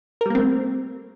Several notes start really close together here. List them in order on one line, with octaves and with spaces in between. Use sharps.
A#4 G3 A#3 C4 A3